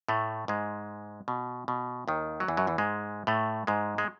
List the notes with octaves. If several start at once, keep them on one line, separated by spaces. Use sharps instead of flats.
A2 A3
G#2 G#3
B2
B2
D#2 D#3
F#3
E2 E3
F#2 F#3
E2 E3
G#2 G#3
A2 A3
G#2 G#3
G#3